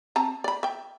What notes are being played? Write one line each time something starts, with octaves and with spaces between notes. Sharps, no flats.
C4 A5 A#5
D5 B5
E5 G5